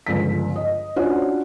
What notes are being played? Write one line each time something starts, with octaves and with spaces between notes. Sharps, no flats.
G1 C#2 F3 B6
D#5
C#4 D4 F4 F#4 C5 C#5